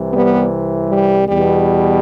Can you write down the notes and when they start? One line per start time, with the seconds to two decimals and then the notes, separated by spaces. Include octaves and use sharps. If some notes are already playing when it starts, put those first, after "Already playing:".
Already playing: C2 C3 E3
0.14 G3 B3
0.90 G3
1.29 E2 B2 G3